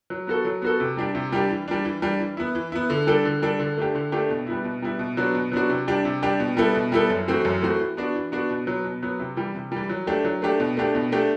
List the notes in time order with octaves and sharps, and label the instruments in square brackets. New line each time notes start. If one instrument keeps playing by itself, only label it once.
[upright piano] F#3
B3 F#4 A4
F#3
B3 F#4 A4
C3
G3 D4 G4
C3
G3 D4 G4
E3
G3 D4
E3
G3 D4
E3
B3 E4
E3
B3 E4
D3
G3 D4 A4
D3
G3 D4 A4
D3
A3 D4 G4
D3
A3 D4 G4
B2
G3 B3 E4
B2
G3 B3 E4
B2
F#3 B3 D4 F#4
B2
F#3 B3 D4 F#4
C3
G3 D4 G4
C3
G3 D4 G4
B2
G3 B3 E4 A4
B2
G3 B3 E4 A4
F#2
E3 A3 C4 F#4
F#2
E3 A3 C4 F#4
E3
B3 D4 F#4
E3
B3 D4 F#4
B2
F#3 B3
B2
F#3 B3
C3
E3 G3
C3
E3 G3
F#3
A3 D4 G4
F#3
A3 D4 G4
B2
A3 D4 G4
B2
A3 D4 G4